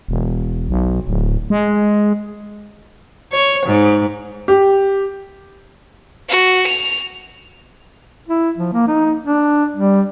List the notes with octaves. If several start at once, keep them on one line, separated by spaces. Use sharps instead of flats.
E1
B1
D1
G#3
C#5
G#2
G4
F#4
F7
E4
F3
A#3
D#4
D4
G3